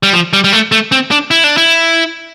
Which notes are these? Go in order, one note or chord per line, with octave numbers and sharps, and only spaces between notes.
G3
F3
G3
G3
A3
A3
C4
D4
E4
D4
E4